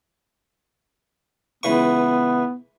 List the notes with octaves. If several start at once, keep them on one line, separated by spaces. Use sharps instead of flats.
C#2 E3 B3 C#6